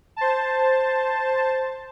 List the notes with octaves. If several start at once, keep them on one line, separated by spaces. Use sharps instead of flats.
C5 A5